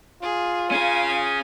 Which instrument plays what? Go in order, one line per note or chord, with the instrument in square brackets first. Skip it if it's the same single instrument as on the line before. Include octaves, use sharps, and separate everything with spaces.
[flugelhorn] F4 [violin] G#4
[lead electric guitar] C#4 G#4 [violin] G#5